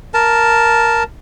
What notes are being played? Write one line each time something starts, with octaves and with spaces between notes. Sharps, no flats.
A#4 A5